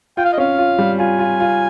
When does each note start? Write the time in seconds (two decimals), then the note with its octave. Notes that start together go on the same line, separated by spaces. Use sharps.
0.17 F4 G5
0.25 F5
0.33 D#5
0.38 C#4 F5
0.58 F4
0.79 G3
0.99 F4 G#5
1.19 F4
1.40 F4